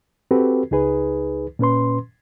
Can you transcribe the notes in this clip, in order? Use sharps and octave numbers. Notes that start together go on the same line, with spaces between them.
C4 F#4 G4 A4 B4
C#2 D#4 G#4 B4
A#2 C#4 B4 C6